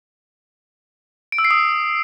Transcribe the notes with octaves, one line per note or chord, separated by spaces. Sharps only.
D7
E6
C7
D#6